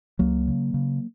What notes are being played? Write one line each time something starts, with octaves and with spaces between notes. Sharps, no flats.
C#2 F#3 A#3
C#3
C#3